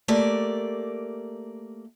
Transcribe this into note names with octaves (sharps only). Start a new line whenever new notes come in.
A3 A#3 G4 D5